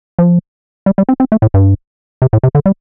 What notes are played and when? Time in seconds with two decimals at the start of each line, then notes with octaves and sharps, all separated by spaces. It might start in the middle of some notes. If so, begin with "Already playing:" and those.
0.19 F3
0.86 G3
0.98 G3
1.09 C4
1.20 C4
1.32 A3
1.42 A2
1.54 G2
2.22 C3
2.33 A2
2.43 C3
2.55 D3
2.66 G3